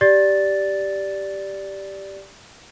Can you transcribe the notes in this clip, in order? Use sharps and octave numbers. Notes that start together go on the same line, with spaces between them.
G4 D5 A6